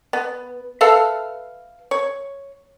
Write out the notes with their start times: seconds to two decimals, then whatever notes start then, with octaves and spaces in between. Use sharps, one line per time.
0.13 B3
0.81 A4 B4 E5 F5
1.91 C#5